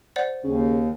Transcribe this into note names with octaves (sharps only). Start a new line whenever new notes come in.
C5 D5 F#5
D#2 C#3